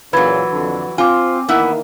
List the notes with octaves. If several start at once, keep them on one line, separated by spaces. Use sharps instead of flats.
A#2 C#3 E3 F#3 B4 B5 G#6
F2 D3
C4 F4 G#5 D6
D#3 E3 A#3 B3 E4 E5